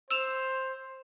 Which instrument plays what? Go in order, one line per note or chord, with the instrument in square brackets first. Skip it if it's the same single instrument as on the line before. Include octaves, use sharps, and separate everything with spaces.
[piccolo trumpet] C5 [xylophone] E6 E7 F7